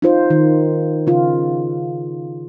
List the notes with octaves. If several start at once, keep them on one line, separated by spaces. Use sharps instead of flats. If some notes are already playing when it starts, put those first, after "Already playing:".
D#4 F4 C5
D#3
C#3 F4